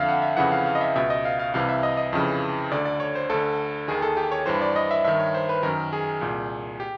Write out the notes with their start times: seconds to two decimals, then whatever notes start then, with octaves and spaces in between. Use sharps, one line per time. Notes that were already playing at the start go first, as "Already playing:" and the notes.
Already playing: F2 D3 E5 F5
0.08 F#5
0.22 E5
0.37 F2 C#3 E3 F#5
0.52 F5
0.66 F5
0.75 D#5
0.81 E5
0.96 C#2 B2 E5
1.10 D#5
1.25 F5
1.39 F5
1.54 C2 C3 E3 F5
1.69 E5
1.83 D#5
1.97 D#5
2.13 F2 C#3 E3
2.71 D2 D3 D5
2.85 D5
3.00 C#5
3.15 C5
3.30 D2 D3 A4
3.88 D#2 D#3 G#4
4.02 A4
4.17 G4
4.32 C#5
4.46 G2 E3 C5
4.61 D5
4.76 D#5
4.91 E5
5.04 G2 D#3 E5
5.19 C#5
5.34 C5
5.49 B4
5.63 F#2 D#3 A#4
5.93 G#4
6.21 C2 A#2
6.80 G4